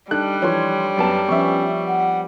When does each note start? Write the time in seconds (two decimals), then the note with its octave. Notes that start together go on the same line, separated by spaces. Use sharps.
0.11 G3 D4 D#4 A4 F#6
0.42 E3 F3 C#5 C6
0.97 F#2 B3 A5
1.29 F3 B3 C#4 E5 C#6
1.87 F#5